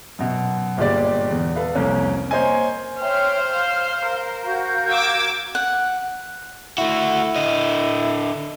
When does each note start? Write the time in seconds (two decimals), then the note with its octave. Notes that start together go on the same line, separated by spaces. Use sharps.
0.19 F#2 B2
0.77 G1 A#2 G#3 G4 D5
1.31 E2
1.56 A4 B4 F5
1.75 C2 F2 A#3 C#4
2.31 A#3 C5 C#5 D#5 G#5
3.01 C5 C#5 E5 G5 F6
3.50 F5
4.08 A#4
4.43 F#4 F5 G6
4.91 D6 E6 G#6
5.55 F#5
6.78 A3 E4 F#4
7.36 D3 D#5